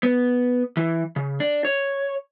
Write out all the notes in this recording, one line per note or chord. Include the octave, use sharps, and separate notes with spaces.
B3
E3
C#3
D4
C#5